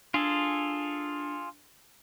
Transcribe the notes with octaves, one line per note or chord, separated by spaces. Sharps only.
D4 F4 G#4 A4 G#5